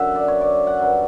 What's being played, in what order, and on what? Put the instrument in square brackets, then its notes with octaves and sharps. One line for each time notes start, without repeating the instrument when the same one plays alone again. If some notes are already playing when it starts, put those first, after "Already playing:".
Already playing: [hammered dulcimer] F#2 D3 F#3 E5 F#5
D5
C#5
D5
F#5
G2 F#3